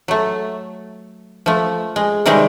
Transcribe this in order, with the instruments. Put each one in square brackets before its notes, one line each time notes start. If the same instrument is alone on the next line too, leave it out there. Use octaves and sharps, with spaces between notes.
[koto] F#3 A3
F3 A3
G#3
C3 D#3 G3 G#3 C4 G4